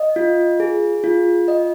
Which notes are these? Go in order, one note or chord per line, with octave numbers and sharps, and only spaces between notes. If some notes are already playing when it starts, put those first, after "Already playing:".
Already playing: D#5
F4
G#4
F4
D#5